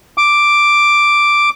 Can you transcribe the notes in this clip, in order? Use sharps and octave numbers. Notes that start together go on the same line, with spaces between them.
D6